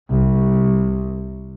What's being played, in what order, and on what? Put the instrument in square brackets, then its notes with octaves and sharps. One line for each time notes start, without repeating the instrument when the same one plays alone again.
[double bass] C2